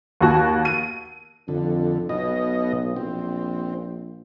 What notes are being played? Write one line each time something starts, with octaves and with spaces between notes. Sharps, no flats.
D#2 F#4
D#7
F2 D3
B1 B2 D#5
A#1 C4